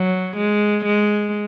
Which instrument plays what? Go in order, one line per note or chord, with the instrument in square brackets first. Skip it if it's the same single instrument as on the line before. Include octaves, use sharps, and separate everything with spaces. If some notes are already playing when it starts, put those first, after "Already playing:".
Already playing: [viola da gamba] F#3
G#3
G#3